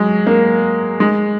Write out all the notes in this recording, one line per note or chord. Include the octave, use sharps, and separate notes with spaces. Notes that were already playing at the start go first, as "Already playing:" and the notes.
Already playing: F#3 G#3
A#3
G#3